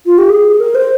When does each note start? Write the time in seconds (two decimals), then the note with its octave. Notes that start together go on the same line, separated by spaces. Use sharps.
0.06 F4
0.18 G4
0.30 G#4
0.60 A#4
0.75 C5